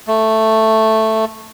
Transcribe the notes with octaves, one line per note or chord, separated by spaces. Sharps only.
A3